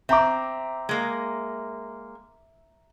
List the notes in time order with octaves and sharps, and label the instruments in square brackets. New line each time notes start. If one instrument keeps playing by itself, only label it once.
[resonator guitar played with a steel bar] C4 [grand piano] E5 A#5 D6
[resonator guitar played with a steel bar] G#3 A#3